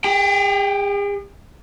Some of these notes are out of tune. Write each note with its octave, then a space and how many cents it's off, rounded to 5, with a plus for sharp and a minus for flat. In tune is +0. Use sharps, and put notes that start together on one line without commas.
G#4 -45 G5 +0